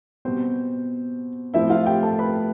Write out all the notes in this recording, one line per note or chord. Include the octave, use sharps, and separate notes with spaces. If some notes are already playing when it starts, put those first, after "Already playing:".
B2 G3 B3 C4 C5
A2 F3 C4 E4 E5
F4 F5
G4 G5
A4 A5
B4 B5